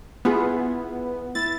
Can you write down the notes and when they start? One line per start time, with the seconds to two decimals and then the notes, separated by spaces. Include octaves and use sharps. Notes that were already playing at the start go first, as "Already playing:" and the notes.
0.25 B3 E4 F4 G#4
1.35 E4 A6